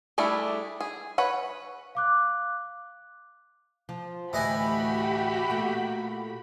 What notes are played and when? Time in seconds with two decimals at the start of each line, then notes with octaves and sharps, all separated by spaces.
0.18 G3 A3 D4 E4 G#4
0.81 G#4
1.18 B4 C#5 F#5
1.95 F5 D6 F#6
3.89 F3
4.33 D2 A2 E3 F#4 G4 D#5 G#5 B5
5.50 A#2 A3